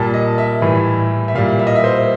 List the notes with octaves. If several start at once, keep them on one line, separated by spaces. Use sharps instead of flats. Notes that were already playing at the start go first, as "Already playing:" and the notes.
Already playing: A#2 G3 A5
D#5
E5
A2 E3 G3
E5
A#2 G3 F5
E5
D#5
E5
C5